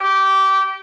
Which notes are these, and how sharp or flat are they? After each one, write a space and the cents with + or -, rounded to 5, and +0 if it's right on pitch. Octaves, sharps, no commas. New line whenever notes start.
G4 -20